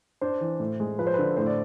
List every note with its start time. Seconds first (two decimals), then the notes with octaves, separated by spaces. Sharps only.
0.21 D4 C5
0.41 E3
0.60 A2
0.80 G#3
0.99 F3 B4
1.07 C5
1.14 D3 B4
1.37 A2 C5
1.47 D5